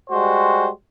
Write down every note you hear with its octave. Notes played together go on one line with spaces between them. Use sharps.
G3 G#3 F#4 C5